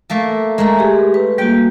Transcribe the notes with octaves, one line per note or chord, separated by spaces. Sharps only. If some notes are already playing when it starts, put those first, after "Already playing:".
A3 A#3 A4
G#3 A3 A#4 A#5
G4 G#4
B4
G3 A#3 F#4 G5